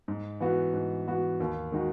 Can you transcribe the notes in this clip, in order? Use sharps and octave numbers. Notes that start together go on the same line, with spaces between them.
G#2
E3 B3 F#4
G#2
E3 B3 F#4
D#2
D#3 G#3 D#4 F#4